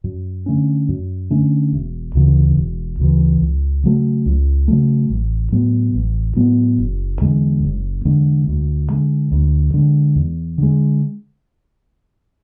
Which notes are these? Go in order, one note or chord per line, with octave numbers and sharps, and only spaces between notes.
F#2
D3 A3 C#4
F#2
D3 A3 C#4
E1
D2 C#3 E3
E1
D2 C#3 E3
C#2
C#3 F#3 A3
C#2
C#3 F#3 A3
A1
A2 F#3 B3
A1
A2 F#3 B3
F#1
E2 D3 G#3
F#1
E2 D3 G#3
D2
D3 G#3
D2
D3 G#3
E2
D3 G#3